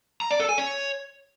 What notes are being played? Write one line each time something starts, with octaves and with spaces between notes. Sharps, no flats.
A#5
D5
A4
G#5
C#5